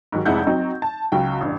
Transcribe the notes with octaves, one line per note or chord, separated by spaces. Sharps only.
G#2 D#3 F#3
F1 F2 G#3 E4 F#5 G6
F#3 C4 D#4
A5
C#2 F#3 G5
A1 G2